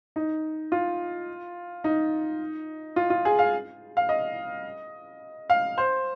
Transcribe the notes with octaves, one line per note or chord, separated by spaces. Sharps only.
D#4
F4
D#4
F4
F4
G#4
F5
F5
D#5
F5
C5